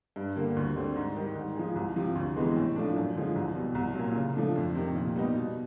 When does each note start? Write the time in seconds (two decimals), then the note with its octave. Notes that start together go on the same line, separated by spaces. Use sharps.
0.16 G2
0.36 D3 G3 A#3
0.56 D2
0.76 D3 G3 C4
0.96 G#2
1.16 D#3 G3
1.35 G#2
1.56 F3 G#3
1.76 C2
1.96 C3 F3
2.15 D2
2.36 C3 E3 G#3 B3
2.56 A2
2.76 F3 A3 D4
2.95 F#2
3.15 D3 F3 G#3
3.36 C2
3.56 B2 G3
3.75 C2
3.95 A#2 F#3
4.15 C#3
4.35 F3 A3 D4
4.56 F2
4.75 C3 D#3
4.95 A#2
5.16 G3 B3 D#4
5.35 B2